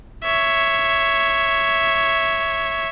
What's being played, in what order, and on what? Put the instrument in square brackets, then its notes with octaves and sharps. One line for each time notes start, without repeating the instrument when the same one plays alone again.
[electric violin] C#5 E5